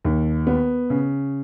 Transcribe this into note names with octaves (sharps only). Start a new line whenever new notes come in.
D#2
B3
C#3